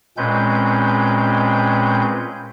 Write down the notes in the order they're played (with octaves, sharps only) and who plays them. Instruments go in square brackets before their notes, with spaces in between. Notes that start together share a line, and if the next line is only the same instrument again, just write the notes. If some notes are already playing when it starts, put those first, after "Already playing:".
[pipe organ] A#2 G#3 C4 C#4 B4 G6